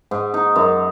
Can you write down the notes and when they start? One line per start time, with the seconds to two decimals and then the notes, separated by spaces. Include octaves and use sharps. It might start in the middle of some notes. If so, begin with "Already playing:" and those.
0.11 G#2
0.34 D#4
0.56 F#2